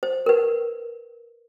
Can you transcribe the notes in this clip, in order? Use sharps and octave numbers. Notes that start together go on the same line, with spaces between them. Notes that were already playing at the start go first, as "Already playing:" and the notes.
C5
A#4 B4